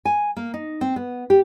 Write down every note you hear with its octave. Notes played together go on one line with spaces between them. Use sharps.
G#5
A#3
D#4
C4
B3
G4